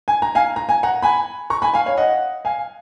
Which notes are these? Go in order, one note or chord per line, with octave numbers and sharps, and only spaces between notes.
G#5
A#5
F5 G#5
A#5
G#5
F#5 A#5
G#5 B5
A#5 C#6
G#5 B5
F5 G#5
C#5 F5
D#5 F#5
F5 G#5